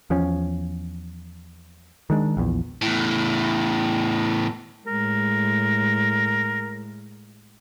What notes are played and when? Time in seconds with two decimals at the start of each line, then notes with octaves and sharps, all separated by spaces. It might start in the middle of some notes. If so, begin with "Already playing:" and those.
0.10 E2 F3 C#4
2.10 D#3 G#3 D4
2.37 A#1 E2
2.82 E2 A2
4.87 A2 G#3 A#4